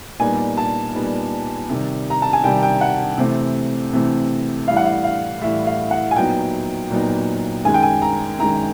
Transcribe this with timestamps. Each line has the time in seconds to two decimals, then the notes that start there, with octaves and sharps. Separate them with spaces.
0.20 A#2 G3 B3 D#4 G#5
0.57 A5
0.95 A#2 G3 B3 D#4
1.69 C3 D#3 G3
2.10 A#5
2.22 A5
2.33 G#5
2.44 C3 D#3 G3 G5
2.63 G5
2.81 F#5
3.18 C3 E3 A3 C4
3.93 C3 E3 A3 C4
4.68 A2 E3 G3 F5
4.77 F#5
4.85 F5
5.04 F5
5.41 A2 E3 G3 E5
5.67 F5
5.91 F#5
6.11 G#5
6.15 A#2 F#3 B3 D#4 G5
6.90 A#2 F#3 B3 D#4
7.65 F#2 D#3 G#3 G#5
7.74 G5
7.83 G#5
8.02 A#5
8.39 F#2 D#3 G#3 A#5